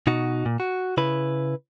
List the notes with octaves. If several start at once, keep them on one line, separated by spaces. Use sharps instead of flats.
B2 D#4 F#4
A#2
F#4
C#3 E4 B4 B5